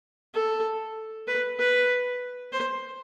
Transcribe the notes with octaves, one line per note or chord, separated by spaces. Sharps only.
A4
B4
B4
C5